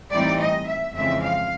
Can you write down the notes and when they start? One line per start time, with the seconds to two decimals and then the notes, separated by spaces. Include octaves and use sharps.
0.11 A2 E3 G3 C4 D#4 D5
0.39 D#5
0.67 E5
0.95 F2 C#3 E3 G#3 C4 E5
1.23 F5